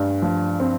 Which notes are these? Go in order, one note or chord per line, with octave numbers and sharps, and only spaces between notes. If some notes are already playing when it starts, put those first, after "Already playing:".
Already playing: G2
F3
C4